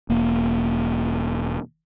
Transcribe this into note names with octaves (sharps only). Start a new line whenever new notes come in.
E1 A#3